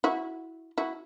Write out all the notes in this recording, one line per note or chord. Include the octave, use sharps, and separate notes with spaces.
E4 F#4
E4 F#4